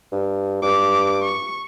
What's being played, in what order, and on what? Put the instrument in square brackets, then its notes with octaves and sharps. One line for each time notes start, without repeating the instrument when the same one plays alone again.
[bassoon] G2
[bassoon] G2 [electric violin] D6
[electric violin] C#6